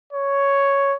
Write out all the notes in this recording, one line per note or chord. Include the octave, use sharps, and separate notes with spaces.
C#5